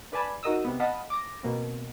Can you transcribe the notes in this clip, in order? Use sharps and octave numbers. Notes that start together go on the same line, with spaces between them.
D4 B4 D5 G#5 A5 B5
D#4 F#4 A#4 D#5 D#6 E6
C3 B3
D#5 F5 F#5 A5 B5 D#6
D6 A#6
B2 A#3 C4